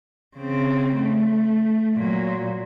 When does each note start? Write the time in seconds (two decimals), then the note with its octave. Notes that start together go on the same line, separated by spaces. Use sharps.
0.36 C#3 C4
0.96 A3
1.95 A#2 F#3